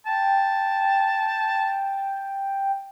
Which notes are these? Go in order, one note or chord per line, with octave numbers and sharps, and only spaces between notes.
G5 A5